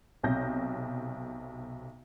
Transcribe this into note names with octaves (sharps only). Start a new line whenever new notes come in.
B1 C3 G6 A#6